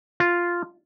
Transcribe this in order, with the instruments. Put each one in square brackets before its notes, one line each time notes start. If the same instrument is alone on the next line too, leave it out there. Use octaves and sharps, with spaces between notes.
[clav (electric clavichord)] F4